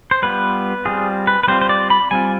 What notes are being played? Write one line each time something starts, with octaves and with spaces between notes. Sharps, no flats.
C5
G3 B3 F4 B4
G3 C4 F4 G#4
B4
B4
G3 C4 F4 C5
C5
D5
B5
G3 C4 F4 G#5